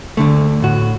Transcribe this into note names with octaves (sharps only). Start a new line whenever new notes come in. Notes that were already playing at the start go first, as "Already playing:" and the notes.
D2 D3 A3
A2 F#4